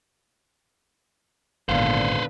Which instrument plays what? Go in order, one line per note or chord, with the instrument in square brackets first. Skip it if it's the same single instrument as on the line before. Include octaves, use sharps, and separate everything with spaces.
[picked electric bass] G#1 [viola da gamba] A#2 D3 B3 [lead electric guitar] B4 C5 [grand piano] F5